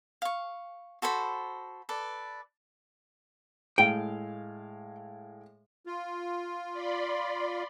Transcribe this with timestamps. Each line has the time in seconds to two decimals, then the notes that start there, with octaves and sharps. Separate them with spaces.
0.22 F5 C#6
1.02 F#4 A4 C5 B5
1.89 A4 B4 D5
3.78 A2 G#3 F5 G5
5.86 F4
6.72 D5 B5 C6